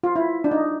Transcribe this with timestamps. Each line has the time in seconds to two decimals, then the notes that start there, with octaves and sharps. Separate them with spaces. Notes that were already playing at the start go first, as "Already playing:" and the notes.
0.03 F4
0.16 E4
0.44 D4
0.51 D#4